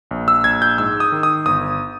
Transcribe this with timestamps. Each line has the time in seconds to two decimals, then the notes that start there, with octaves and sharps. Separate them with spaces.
0.11 A#1
0.28 E6
0.44 A#1 G#6
0.62 G6
0.78 G#2 E6
1.00 D#6
1.12 D#3
1.23 D#6
1.46 G1 D#6